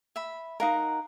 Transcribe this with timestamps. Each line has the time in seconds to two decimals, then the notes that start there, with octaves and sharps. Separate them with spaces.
0.16 E5 B5
0.60 D#4 A#4 F5 F#5 A#5